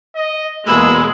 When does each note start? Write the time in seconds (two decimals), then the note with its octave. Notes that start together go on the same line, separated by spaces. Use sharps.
0.16 D#5
0.67 E2 B2 G#3 A#3 B5 E6